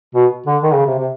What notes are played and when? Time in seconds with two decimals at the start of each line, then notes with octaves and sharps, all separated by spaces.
0.15 B2
0.46 D3
0.63 D#3
0.74 C#3
0.86 C3
0.98 C3